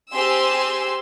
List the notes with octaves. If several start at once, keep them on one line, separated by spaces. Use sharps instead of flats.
C4 G4 G#4 G#5 C6 E6